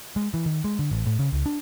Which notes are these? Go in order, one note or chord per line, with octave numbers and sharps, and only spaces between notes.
G#3
E3
D#3
G#3
D3
A1
A2
C#3
C#2
D4